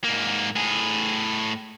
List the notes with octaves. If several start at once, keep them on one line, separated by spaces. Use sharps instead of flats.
G#2 A#3
A2 G#4